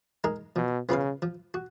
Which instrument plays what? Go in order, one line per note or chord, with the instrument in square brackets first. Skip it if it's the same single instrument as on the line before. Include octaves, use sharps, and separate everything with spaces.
[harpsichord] G#3 D#4 A#4
[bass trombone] B2 [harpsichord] F3
[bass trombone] C#3 [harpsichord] B3 F4 B4 F5
[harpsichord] F3
F#4